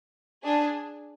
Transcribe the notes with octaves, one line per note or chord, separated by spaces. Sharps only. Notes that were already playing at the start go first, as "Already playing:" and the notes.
D4 G#4